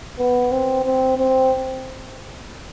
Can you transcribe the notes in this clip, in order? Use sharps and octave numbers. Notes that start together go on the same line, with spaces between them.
B3
C4
C4
C4